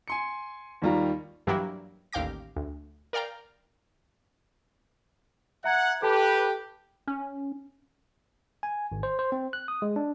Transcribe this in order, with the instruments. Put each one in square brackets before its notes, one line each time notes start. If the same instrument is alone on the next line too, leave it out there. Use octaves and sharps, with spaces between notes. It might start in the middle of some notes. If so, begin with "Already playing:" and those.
[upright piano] G#5 C6 C#7
D#2 D#3 G3 F4 A#5
[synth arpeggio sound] G2 E3 F#3 G3 A#3 E4
A1 D#2 F5 G5 D6 A#6
D2
A#4 D5 F5 G5 A#5
[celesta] E5 A#5 G#6 [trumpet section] F#5
[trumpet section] G4 B4 [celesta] A4 G5 A5
[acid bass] C#4
[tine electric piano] G#5
G#1
C5
C5
C4
F#6
D#6
G#3
D4